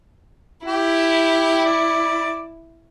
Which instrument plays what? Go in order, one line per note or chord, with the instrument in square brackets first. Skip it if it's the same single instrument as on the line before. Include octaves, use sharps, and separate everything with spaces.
[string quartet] E4 [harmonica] G4
[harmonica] D5